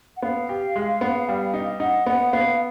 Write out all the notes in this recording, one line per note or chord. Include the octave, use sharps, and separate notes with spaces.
F#5
B3 F5
G4
G#3
B3
G3
D#4
D#4 F#5
B3 F#5
B3 F5